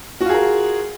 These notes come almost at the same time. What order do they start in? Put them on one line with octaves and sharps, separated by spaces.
F#4 F4 G#4 A#4